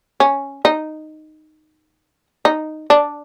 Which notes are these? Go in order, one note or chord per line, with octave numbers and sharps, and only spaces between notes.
C#4
D#4
D#4
D4